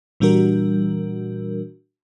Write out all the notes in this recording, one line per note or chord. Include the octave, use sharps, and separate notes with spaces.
A#2 E3 G3 D4 F#4 A#4